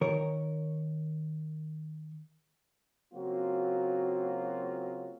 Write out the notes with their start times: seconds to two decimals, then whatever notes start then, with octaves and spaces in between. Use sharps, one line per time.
0.01 D#3 A#4 C#5
3.14 C#3 F#3 A#3 C4 F4 F#4